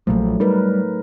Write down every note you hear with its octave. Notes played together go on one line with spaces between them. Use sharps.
A#1 A#2 F3 F#3 A3
G3 D#4 A#4 B4